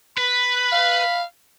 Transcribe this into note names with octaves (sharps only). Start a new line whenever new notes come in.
B4 B5
F5